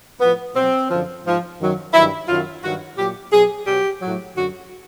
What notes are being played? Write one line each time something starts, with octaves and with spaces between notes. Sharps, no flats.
A2 F3 B3
B2 F#3 C4
F#2 D3 F3
G#2 F3
F#2 D#3 F#3
G2 D#3 F#3 E4
F#2 D#3 F#3 F4
G2 D#3 F#3 F#4
A#2 F#3 G4
B2 F#3 G#4
B2 F#3 G4
A2 F#3
F#2 D3 F#3 F#4